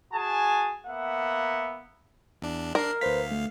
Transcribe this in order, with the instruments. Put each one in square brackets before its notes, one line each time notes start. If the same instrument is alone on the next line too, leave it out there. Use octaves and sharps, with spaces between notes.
[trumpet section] F#4 G#4 G#5 A5
A#3 B3 E5 F#5
[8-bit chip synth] E2 D4
[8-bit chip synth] D4 C7 [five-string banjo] A#4
[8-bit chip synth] D2 F5 [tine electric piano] B4 C5 B6
[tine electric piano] A3